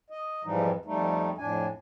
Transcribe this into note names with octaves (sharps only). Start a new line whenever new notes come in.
D#5
F2 G#2 E3 F3 G3 D#4
F2 G3 A3 D#4
F2 A2 D4 G#5